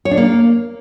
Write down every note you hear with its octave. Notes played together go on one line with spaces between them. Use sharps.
C#5
D4
A#3